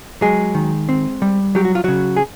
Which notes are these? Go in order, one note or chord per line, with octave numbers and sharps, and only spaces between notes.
F#3 G#3 G#4
D#3
C4
G3
F#3 G4
F#4
F4
C#3 F#3 F#4
G#4